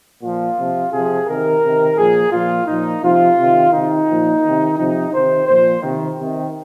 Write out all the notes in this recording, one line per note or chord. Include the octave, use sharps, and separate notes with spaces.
A#2 F3 F4
C3 F3
C3 F3 G#4
C3 D#3 A#4
C3 D#3
A#2 F3 G#4
A#2 F3 F4
A#2 F3 D#4
C3 F3 F4
C3 D#3
C3 D#3 D#4
A#2 F3
C3 D#3
C3 F3 D#4
C3 D#3 C5
A#2 F3 C5
C3 D#3
C3 D#3